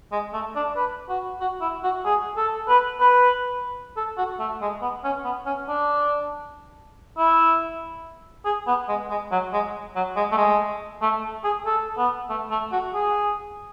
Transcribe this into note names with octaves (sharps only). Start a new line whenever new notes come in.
G#3
A3
D4
B4
F#4
F#4
E4
F#4
G#4
A4
B4
B4
A4
F#4
A3
G#3
B3
C#4
B3
C#4
D4
E4
G#4
B3
G#3
G#3
F#3
G#3
F#3
G#3
A3
G#3
A3
G#4
A4
B3
A3
A3
F#4
G#4